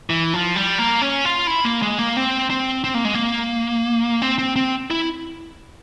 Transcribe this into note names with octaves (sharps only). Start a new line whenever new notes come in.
E3
F3
G3
A#3
C#4
F4
E4
A#3
G#3
A#3
C4
C4
C4
A#3
G#3
A#3
C4
C4
C4
E4